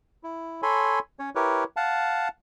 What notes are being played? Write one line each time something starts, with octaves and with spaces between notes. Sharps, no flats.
E4
A4 C#5 G#5 B5 C6
C#4 C#5
E4 G4 A#4 B4 C#5
F5 F#5 A5